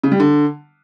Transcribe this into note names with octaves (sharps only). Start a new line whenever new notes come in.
C#3
G3
D3